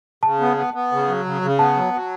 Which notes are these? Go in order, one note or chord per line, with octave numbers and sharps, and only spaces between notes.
C#3 A5
B3
B3
B3
C#3
F#3
C#3
C#3
B3 A5
F#3
F#3